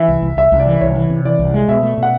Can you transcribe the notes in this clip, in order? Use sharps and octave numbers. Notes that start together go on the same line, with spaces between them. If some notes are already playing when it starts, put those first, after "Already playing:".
Already playing: E3 E5
C2
C2
C2 E5
C2
D5
E3
C2 C#5
E3
C3
E3 D5
C2
G#3
B2 E5
A3
B2 F#5